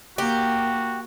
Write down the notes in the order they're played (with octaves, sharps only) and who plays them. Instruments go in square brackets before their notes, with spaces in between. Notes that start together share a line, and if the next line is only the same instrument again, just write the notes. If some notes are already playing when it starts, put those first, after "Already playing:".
[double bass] A#3 [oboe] F#4 [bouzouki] G4